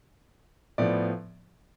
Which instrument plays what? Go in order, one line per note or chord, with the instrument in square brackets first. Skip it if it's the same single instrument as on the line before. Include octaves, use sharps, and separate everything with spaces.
[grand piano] A2 F3 B3 D5